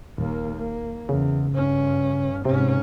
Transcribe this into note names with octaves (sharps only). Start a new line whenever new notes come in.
D#1 D#2 A#3
A#3
E2 C#3
G2 C#4
G#2 C3 C#4